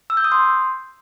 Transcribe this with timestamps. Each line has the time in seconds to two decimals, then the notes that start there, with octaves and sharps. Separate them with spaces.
0.10 E6
0.17 G6
0.24 D#6
0.32 C6